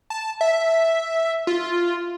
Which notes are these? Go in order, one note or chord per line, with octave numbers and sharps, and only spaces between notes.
A5
E5
F4